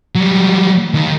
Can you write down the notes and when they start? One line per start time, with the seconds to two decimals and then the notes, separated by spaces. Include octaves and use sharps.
0.15 F#3 G3
0.94 D#2 D#3